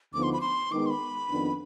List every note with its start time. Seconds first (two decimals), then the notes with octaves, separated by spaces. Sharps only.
0.13 D2 D3 F3 B3 D#4 D6
0.23 C6
0.33 B5
0.41 C6
0.72 D#3 G#3 B3 D6
0.86 C6
0.90 B5
1.30 F2 D#3 B3 D4